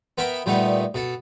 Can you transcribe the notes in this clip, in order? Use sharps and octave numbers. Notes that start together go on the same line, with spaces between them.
B3 A#4 E5 G5 B5
A#2 G3 A3 B3 D#4
B2 A4